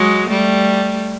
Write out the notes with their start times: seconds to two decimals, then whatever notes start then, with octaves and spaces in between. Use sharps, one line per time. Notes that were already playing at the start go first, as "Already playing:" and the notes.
Already playing: F#3 G#3
0.30 G3 A3